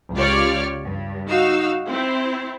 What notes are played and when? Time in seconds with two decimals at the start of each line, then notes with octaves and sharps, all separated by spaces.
0.14 C#2 F4 G4 C#5 D5 F6
0.84 G2
1.28 D#4 F#4 F5 E6
1.88 C4 E4